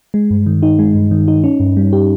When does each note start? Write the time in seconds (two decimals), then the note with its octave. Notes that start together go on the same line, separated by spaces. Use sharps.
0.14 G#3
0.30 G2
0.46 D#3
0.63 D#4
0.79 G#3
0.95 G2
1.11 D#3
1.28 D#4
1.44 C#4
1.60 G2
1.77 G3
1.93 G4